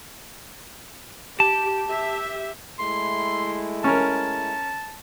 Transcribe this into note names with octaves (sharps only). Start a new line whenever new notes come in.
G4 A5
G4 E5
G#3 A3 E4 C6
C#4 A#4 A5